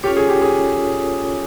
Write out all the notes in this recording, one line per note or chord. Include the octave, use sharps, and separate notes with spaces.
C#4 F4 G4 A4 C#5
G#4
G4
G#4